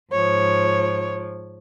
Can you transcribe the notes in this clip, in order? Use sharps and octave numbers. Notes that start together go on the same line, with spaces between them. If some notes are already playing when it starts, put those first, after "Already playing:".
G#2 F3 C#5